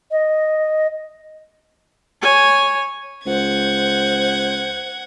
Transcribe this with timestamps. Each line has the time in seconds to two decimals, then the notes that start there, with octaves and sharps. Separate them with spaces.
0.11 D#5
2.22 C#5 G#5
3.26 C#2 C5 F#5 G#6